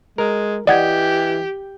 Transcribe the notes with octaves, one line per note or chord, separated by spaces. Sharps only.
G#3 A#4
E3 G4 D5 D#5 F#5 G#6